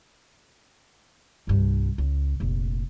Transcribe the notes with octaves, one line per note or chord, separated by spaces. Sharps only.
C2 G2
C#2
F1 A#1